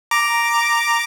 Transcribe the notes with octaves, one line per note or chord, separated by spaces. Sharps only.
A#5 D6